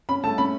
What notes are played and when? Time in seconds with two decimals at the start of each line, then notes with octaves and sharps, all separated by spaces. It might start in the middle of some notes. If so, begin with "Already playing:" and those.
0.09 C#4 B5
0.24 A3 A5
0.38 C#4 B5